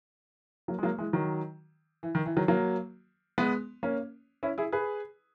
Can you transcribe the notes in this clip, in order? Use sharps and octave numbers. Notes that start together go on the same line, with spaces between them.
F#3 A#3
G#3
F#3 A#3
E3 G#3
D#3 F#3
E3
D#3
E3
D#3 F#3
F#3 A#3
G#3 B3
A#3 C#4
C#4 E4
E4 G#4
G#4 B4